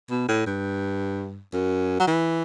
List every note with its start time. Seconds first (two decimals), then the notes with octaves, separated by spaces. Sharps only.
0.11 B2
0.28 A2
0.46 G2
1.53 F#2
2.00 F#3
2.07 E3